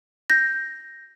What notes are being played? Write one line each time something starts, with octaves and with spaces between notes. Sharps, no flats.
G6 A#6